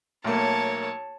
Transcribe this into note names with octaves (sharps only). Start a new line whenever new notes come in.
B1 A3 A#3 C#5 A5